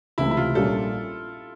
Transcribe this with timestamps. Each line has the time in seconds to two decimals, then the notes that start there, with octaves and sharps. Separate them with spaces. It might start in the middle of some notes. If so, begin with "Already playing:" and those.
0.18 C#2 C3 E3 A3 C4 E4
0.31 E4
0.37 F4
0.55 A#1 A#2 G3 A#3 C#4 A4